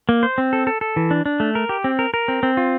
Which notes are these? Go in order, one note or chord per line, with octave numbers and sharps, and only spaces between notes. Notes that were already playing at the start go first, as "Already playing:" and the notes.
A#3
C5
C4
A4
A4
A4
E3
D4
D4
A3
A#4
G4
C4
A#4
A#4
C4
C4
F4